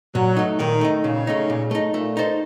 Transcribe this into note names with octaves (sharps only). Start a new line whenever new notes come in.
A#2 F#3
A3 D#4
A#2 D#3
A3 D#4
A#2 C#3
A3 D#4
A#2
A3 D#4
A#2 A3
D#4 A4 C5